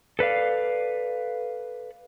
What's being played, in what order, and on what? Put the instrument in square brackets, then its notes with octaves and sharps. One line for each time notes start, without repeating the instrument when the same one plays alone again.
[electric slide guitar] A4 B4 D5 F5